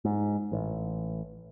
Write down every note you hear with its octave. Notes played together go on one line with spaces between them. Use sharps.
G#2
A1